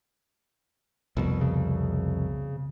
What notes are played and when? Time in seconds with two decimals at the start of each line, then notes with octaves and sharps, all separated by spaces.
1.17 C2 F2 B2
1.41 C#3